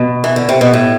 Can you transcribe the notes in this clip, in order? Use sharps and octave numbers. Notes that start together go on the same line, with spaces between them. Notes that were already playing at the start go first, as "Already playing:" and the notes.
Already playing: B2
E3
D3
C3
B2
A2